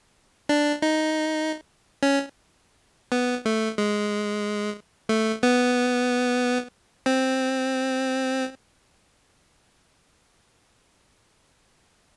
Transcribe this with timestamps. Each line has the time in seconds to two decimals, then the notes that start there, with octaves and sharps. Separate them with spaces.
0.49 D4
0.82 D#4
2.03 C#4
3.12 B3
3.46 A3
3.78 G#3
5.09 A3
5.43 B3
7.06 C4